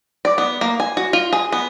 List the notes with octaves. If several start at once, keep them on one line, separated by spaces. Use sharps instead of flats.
D5
B3
A#3
G#5
F#4
F4
G#4
B3